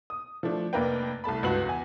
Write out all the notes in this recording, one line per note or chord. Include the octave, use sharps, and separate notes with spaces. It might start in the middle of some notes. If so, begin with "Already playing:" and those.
D#6
F3 A3 D4
F1 A#3 D4 A#4 B4 G5
C2 A3 A5 B5
C#2 G2 F#4 B4 F#7
E2 G#5